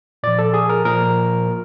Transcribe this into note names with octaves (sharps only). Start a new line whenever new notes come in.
A#2 F3 D5
A4
G#4
A#4
A#2 F3 A#4